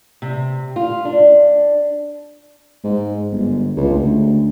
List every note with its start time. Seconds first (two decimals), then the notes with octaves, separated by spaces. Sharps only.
0.22 C3
0.76 F4
1.05 D4
2.84 G#2
3.32 G1
3.77 C#2
3.94 D2